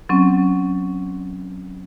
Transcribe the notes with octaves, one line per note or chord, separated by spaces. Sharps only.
F#3 C4 C#4